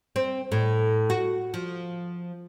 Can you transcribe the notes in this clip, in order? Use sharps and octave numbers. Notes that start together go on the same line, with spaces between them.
C4
A2
F#4
F3